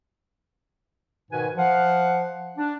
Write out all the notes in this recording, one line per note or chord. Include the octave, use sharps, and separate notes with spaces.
G#2 B2 D#3 B4 G#5
F3 F5 F#5
D4